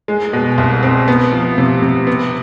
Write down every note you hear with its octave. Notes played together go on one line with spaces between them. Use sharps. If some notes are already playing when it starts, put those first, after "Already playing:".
G#3
B2
C2
C4
B3
F3
C3
C3
B3